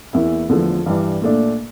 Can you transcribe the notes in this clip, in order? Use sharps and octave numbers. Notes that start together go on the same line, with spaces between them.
E2 E3 A#3 E4
E2 D3 F3 A3
G2 E3 G3 D4
A#2 A3 D4